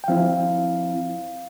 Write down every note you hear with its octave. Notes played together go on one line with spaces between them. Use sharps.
G5
F3 C4 E4 F5